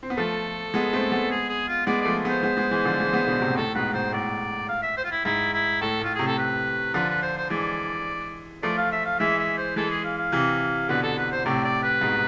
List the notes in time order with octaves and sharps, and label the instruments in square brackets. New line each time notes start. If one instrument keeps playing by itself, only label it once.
[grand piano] C4
B3
[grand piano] F3 A3 [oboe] A4
[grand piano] G#3 B3
A3 C4
G#3 B3
[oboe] G#4
G#4
F4
[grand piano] G#3 B3 [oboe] D5
[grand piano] F3 A3 [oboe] D5
[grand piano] G#3 B3 [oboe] C5
[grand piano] G#3 B3
G#3 B3
E3 G#3
D3 F3
E3 G#3
G#3 B3
B2 D3
A2 C3
[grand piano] A2 [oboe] A4
[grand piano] G#2 B2 [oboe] B4
[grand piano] G#2 B2 [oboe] C5
[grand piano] A2 [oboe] D5
[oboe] F5
E5
C5
F4
E4
[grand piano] G#2 [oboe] E4
[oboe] E4
[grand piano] A2 [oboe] A4
[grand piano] A2 [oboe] F4
[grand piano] A2 C3 [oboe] G#4
[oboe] A4
B4
[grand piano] D3 F3 [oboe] B4
[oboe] B4
C5
C5
[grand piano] E3 G#3 [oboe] D5
[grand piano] F3 A3 [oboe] D5
[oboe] F5
E5
F5
[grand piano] E3 G#3 [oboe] E5
[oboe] E5
C5
[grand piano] E3 G#3 [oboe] A4
[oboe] G#4
F5
F5
[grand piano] C3 E3
[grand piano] B2 D3 [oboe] B4
[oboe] A4
B4
C5
[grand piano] A2 C3 [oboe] D5
[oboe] D5
B4
[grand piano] G#2 B2